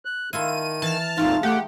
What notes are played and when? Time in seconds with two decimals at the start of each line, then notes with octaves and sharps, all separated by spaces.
0.05 F#6
0.33 D#3 E4 F4 A4 D#7
0.82 E3 A5 F6
1.17 F2 A#2 G#3 A3 D#4 F4
1.43 A3 D#4 G4 F#5